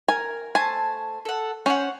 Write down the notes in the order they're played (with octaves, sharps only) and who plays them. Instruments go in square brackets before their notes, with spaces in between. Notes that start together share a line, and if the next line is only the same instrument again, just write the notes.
[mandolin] A#4 [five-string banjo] G#5
[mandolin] A3 C5 A5 [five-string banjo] G#5
[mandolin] A4 F#5
[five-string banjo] C#4 [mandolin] C5 C#5 F#5